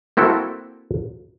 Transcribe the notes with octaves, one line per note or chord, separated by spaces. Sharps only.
A#3 C4 E4 F#4 A4